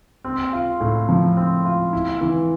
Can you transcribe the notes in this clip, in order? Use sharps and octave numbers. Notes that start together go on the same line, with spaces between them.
C4
F4
A2
F3
C4
F4
E4
E3